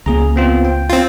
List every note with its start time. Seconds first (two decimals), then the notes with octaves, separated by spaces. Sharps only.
0.06 C#2 A#3 G#4 A#5
0.36 B3 C4 F4
0.65 G5
0.90 C4 F4